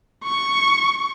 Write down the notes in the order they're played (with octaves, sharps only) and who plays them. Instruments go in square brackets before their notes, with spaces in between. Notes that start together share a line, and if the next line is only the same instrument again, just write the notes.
[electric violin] C#6